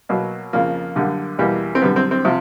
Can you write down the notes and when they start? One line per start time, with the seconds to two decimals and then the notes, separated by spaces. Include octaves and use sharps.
0.09 B2 F#3 A#3
0.53 F2 C#3 F3 A#3
0.96 F#2 D3 G3 A#3
1.39 E2 B2 G3 A#3
1.75 C4
1.82 F#2 D3 G3 B3
1.96 C4
2.11 C4
2.25 C3 F3